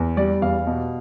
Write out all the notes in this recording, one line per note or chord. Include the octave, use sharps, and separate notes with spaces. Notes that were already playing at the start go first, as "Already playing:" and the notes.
Already playing: E2
G3 D5
E2 F5
B2